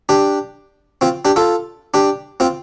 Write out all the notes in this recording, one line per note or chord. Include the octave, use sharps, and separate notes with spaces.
D4 G4
C4 F4
D4 G4
F4 A4
D4 G4
C4 F4